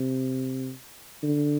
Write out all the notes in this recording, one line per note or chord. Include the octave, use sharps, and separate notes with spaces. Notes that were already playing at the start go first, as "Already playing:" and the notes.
Already playing: C3
D3